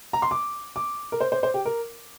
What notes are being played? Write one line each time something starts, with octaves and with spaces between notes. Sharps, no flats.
A#5
C6
D6
D6
A#4
C5
C5
C5
G4
A#4